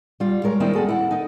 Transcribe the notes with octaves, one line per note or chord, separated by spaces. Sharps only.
G3 F4
G#3 A#4 C#5
D#3 G3 A#3 C4 D#4 E4
F#4 G#4 A4 F#5
E4 F#5
D#4 D#5